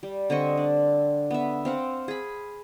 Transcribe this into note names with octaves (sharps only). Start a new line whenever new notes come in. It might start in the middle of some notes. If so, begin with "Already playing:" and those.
G3
D3 C4 D#5 C#6
D4
B3 E5
C4 F5 F#5
G#4 B5